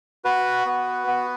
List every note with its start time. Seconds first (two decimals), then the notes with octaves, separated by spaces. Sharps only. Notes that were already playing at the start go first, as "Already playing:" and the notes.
0.25 F#4 B4
0.66 B3
1.07 B3